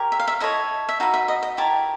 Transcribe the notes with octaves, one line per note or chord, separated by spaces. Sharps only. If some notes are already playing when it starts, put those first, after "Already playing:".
Already playing: G4 A#4 C#5
E5
F5
E5
E4 A4 C#5 D#5
E5
D#4 F#4 B4 F5
E5
D#5
D#5
E4 G4 A#4 C#5 A5